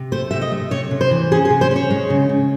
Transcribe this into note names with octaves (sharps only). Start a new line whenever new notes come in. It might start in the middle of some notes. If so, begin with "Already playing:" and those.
Already playing: C3
A3 C5
C3 E5
D#5
A3
C3 C#5
C3
C5
E3
C#4 G#4
G#4
C3
C5
C#4 C#5
G#3
C#3
C#3